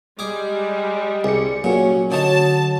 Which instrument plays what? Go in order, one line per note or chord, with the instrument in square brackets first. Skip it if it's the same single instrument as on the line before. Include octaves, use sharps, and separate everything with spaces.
[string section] G3 [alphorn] G#3 [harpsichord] G#4 D6
[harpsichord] C2 [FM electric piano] G#4 D5 C#7
[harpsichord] A#2 [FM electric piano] F#3 F#4 [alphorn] C#4
[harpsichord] D3 D#4 [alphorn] C#5 [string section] A5